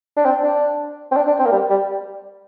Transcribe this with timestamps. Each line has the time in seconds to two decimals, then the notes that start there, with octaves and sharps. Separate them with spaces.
0.17 D4
0.25 C4
0.43 D4
1.11 C4
1.16 D4
1.27 D4
1.39 C4
1.45 A#3
1.51 G3
1.70 G3